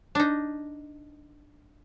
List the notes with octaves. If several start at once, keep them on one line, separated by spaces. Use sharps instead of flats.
D4 D#4